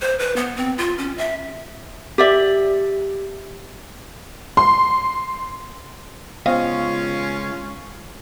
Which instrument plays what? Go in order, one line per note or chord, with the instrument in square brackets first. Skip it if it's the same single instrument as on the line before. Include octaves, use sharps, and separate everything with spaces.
[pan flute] C5
B4
B3
C4
F4
C#4
E5
[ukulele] G4 D5 E5
[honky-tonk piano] C6
[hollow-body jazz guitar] C#2 D#5 F5 [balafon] B3 C5 [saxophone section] C#4 F4